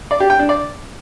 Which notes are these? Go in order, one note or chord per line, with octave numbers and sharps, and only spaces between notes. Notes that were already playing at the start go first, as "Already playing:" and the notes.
D5
G4
G5
D4
D5